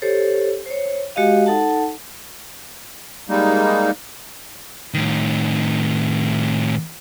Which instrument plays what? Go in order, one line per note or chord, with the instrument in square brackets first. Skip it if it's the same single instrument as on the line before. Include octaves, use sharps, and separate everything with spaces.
[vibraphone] G4 A4 C5 C#5
C5 C#5
G#3 F#4 G4 D#5 F5
D#4 A4 F#5 A5
[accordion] G3 G#3 A#3 D#4
[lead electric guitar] A2 D#3